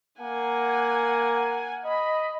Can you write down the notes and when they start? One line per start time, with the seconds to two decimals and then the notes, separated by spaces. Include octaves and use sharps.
0.21 A#3 F#5 G#5
1.85 D#5 B5